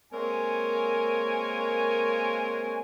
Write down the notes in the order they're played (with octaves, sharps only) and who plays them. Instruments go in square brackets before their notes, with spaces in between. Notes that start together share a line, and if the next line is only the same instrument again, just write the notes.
[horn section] G#3 A#3 C4 A#4 C#5 G#5